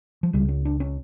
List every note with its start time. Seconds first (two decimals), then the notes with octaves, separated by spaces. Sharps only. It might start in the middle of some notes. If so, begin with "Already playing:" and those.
0.23 F3
0.33 C#2 C#3 G3
0.49 C#4
0.65 D4
0.80 C#4